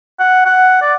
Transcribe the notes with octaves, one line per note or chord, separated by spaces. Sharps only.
F#5
F#5
D5